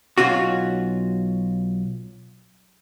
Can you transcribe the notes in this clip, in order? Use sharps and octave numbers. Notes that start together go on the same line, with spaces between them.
B1 C#4 F4 F#4